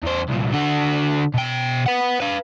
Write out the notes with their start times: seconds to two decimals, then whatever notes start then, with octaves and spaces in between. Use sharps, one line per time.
0.03 E2 C5
0.29 C2 A#2
0.54 D3 F#4
1.34 B2 G5
1.86 B4 F#5
2.20 B4 F5